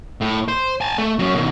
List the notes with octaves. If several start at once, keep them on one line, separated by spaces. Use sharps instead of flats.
A2
C5
G#5 A5
A3
F#3 C#4
B2 D#3